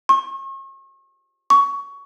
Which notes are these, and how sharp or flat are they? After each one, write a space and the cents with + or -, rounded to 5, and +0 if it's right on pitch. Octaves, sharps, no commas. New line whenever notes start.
C#6 -40
C#6 +20